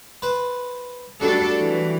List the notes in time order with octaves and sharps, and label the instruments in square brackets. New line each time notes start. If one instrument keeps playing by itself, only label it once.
[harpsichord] B4 C5 A5
[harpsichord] F#3 G3 A3 [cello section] D4 A4
[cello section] E3